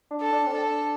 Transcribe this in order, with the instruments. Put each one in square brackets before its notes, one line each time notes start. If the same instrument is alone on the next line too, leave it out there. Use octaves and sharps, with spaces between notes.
[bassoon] D4
[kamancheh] A4
[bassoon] D4
C4
[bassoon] D4 [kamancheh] A4